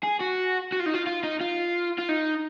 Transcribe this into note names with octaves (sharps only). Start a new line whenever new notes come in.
G#4
F#4
F#4
F4
D#4
F4
F4
D#4
F4
F4
D#4